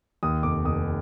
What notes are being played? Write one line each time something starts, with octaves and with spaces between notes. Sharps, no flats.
D#2 D#6
F1 D6
F1 D#6